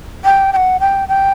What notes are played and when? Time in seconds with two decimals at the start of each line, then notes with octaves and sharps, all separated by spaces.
0.24 G5
0.53 G5
0.56 F#5
0.80 G5
1.08 G5